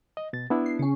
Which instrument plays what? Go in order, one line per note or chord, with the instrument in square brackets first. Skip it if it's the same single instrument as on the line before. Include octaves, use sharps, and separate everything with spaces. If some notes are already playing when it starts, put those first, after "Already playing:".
[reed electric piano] D#5
B2 A6
B3 D4 E4
[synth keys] C7
C#3 C#4